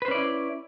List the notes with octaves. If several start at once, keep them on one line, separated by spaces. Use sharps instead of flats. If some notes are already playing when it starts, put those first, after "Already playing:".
C#4 E4 B4 C5 D5